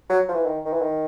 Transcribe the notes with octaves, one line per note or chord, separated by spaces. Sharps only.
F#3
F3
E3
D#3
D#3
E3
D#3